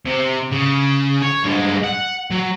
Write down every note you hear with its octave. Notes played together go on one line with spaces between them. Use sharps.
C3
C#3
C#5
G2 G#3
F#5
F#3